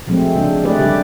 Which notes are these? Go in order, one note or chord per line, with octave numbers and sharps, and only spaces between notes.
F3 F#3 G#3 A3 C4
C#3 G#3 D4
A3 G4 B4 D5
C#3 G3 D4 G4